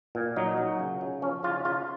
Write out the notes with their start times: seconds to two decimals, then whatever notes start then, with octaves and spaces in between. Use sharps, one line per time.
0.15 A#2
0.36 F#3 D#4
0.57 F#3
0.79 C#3
1.01 C#3
1.22 F3 C#4
1.43 C#3 F4
1.65 C#3 F4